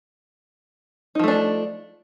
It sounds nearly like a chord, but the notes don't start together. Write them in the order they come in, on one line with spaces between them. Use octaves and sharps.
D#4 F3 A3 D4